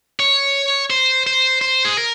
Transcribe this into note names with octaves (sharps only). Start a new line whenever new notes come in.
C#5
C5
C5
C5
G#4
A#4